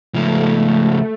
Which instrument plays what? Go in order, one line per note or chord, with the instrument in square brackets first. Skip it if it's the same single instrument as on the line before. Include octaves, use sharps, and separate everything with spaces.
[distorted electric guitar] C#2 F3 [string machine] A3